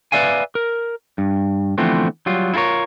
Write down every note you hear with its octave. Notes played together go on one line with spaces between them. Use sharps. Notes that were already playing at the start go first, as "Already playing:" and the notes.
B4 C5 D5 E5 F5 G#5
A#4
G2
D3 E3 F3 A3 B3 C4
F#3 G3 F4
E4 F4 G#4 A#4 C#5